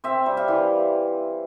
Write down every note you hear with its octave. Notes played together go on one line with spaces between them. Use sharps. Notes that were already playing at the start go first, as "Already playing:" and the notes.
C4 E5
G3
F5
E3